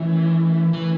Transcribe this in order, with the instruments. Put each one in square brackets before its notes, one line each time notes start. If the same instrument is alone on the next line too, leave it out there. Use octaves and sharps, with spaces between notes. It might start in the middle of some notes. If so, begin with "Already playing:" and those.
Already playing: [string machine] D#3 A3 C#4 E4 [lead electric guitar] E3
[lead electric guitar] E3